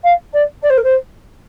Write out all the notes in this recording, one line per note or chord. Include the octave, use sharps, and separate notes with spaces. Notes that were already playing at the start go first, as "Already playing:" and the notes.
F5
D5
D5
C5
A#4
C5